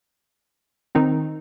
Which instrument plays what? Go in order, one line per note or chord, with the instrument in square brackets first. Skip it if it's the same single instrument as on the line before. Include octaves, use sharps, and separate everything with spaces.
[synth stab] D#3 C4 D#4